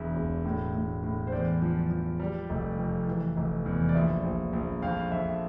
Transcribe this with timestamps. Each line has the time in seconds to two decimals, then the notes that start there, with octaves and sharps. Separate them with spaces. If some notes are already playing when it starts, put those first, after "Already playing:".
Already playing: E1 E2 E5
0.16 E1
0.45 A2
0.74 A2
1.03 A2
1.27 C5
1.32 E2 D5
1.62 F3
1.91 F3
2.20 G3
2.49 F1
2.78 F2
3.07 E3
3.36 F1
3.66 E2
3.89 D5
3.95 A#1 E5
4.24 A#1
4.53 A#1
4.82 F2 F5
5.11 F2 E5